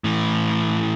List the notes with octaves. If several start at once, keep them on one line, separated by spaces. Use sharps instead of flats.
A2 E3